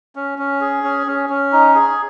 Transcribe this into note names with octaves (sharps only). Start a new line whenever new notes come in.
C#4
C#4
G#4
C#4
C#4
C#4
D#4
G#4